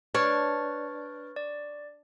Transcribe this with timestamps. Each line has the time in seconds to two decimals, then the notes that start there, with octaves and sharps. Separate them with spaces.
0.15 D4 B4 C#5 F6 A6
1.36 D5